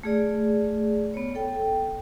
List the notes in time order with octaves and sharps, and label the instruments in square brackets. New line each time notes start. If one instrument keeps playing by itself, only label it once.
[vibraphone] A3 G#4 D5
B3 C#5
A4 G5